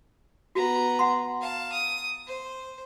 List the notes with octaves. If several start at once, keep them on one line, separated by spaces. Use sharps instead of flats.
B3 F#4 A#5
F#5 C6
F5 A5
D#6
C5